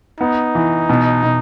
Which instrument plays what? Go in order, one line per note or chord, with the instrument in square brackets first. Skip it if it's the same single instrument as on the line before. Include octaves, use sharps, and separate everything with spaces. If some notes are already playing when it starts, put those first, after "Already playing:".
[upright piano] B3 [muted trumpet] D#4
[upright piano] E3
B2
B2